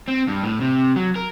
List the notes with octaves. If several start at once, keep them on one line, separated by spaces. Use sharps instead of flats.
C4
G2
A2
C3
F#3
A#4